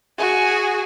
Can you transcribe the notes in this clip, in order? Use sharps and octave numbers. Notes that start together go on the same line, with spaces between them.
F#4 G#4